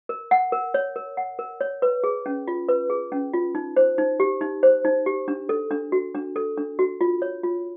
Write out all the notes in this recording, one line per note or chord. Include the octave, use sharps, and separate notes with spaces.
A#4
F#5
A#4
C#5
A#4
F#5
A#4
C#5
B4
G#4
C#4
F4
B4
G#4
C#4
F4
D#4
C5
D#4
G4
D#4
C5
D#4
G4
D4
A4
D4
F#4
D4
A4
D4
F#4
F4
C#5
F4